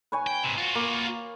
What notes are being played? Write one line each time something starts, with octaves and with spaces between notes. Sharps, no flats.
B4 C#5 G#5
G5
G#2 C3
F4 F#4
A#3